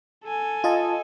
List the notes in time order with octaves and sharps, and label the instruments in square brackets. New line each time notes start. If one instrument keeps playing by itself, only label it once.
[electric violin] A4 G#5
[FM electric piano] F4 D#5 A5